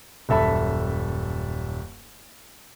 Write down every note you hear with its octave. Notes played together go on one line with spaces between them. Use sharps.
D#1 F#2 A4 E5 A5 B5